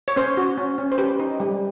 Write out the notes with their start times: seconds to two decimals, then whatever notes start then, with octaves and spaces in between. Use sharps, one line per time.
0.08 C#5
0.16 C#4 C5
0.37 F#4
0.58 C#4
0.78 C#4
0.92 C5
0.98 G4 B4
1.19 D#4
1.40 G3